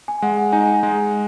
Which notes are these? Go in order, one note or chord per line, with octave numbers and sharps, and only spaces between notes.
G#5
G#3 F#5
F#5
D#4 G#5
G#3